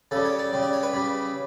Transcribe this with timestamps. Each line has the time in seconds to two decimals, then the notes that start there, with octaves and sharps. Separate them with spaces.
0.11 C#3 G3 A4
0.25 C#5
0.39 D5
0.53 C#3 G3
0.62 D5
0.73 C#5
0.83 B4
0.93 C#3 G3